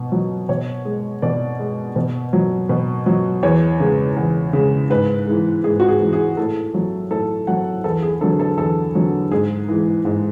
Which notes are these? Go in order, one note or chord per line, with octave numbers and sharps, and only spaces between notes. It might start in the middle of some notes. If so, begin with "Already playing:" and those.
Already playing: B2
F#3
B2 C#5
G#3
B2 D5
G#3
B2
F#3
B2
F#3
E2 C#5
C#3 G#3
E2
C#3 G#3
G#2 B4
E3 G#3
G#2 G#4
F#4
G#4
E3 G#3
G#4
A2 A4
F#3
A2 A4
F#3 F#5
E2 A4
G#4
D3 F#3 A4
A4
E2 A4
D3 F#3
G#2 G#4
E3 G#3
G#2